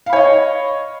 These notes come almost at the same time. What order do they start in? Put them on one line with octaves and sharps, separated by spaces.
F5 B5 C#5 D#5